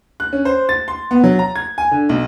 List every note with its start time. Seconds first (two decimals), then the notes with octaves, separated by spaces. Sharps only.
0.20 F#6
0.33 C#4
0.45 C5
0.69 A6
0.88 C6
1.11 B3
1.24 F#3
1.39 A#5
1.55 G#6
1.78 G#5
1.91 D3
2.09 B1